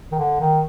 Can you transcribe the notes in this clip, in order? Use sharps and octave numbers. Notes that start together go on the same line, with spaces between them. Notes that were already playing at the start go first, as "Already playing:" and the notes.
D#3
D3
D#3